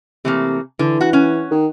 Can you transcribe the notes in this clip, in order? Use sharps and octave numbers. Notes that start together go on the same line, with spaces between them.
C3 E3 A3 A#3
D3 E3
F#4
C#4
D#3